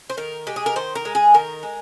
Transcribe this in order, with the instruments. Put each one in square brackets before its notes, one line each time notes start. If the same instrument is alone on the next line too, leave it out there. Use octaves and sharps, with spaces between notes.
[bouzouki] C5
D#3 A#4
G#3 G4
G#4
A#4
D#3 C5
A#4
G#3
G#4
D#3 A#4
G#3